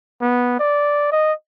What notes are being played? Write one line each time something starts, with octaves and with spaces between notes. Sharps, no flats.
B3
D5
D#5